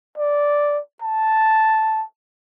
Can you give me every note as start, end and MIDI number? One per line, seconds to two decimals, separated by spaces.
0.18 0.79 74
1.02 2.04 81